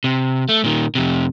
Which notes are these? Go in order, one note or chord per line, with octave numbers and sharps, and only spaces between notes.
C3
A3
A#2 D#3
F2 C3